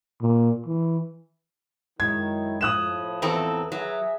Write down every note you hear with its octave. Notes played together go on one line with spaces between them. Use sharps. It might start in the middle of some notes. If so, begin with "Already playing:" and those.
A#2
E3
F#2 D#3 F#3 G#3 E4 G#6
A2 F3 D#6 F#6 E7
E2 C4 A4 B4 A#5
F#3 G#4 E5